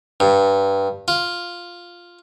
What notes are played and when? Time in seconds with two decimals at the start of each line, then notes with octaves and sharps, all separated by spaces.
0.20 G2
1.08 F4